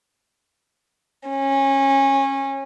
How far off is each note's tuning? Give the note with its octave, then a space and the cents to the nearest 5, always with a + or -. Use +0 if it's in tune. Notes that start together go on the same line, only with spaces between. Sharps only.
C#4 -25